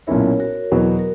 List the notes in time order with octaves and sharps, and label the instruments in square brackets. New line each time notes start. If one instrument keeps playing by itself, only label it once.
[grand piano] B1 A#2 A#3 C#4 E4 [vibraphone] A#4 C#5
[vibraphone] F#4 A#4
[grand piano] E2 B2 F#3 B3
[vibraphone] A#4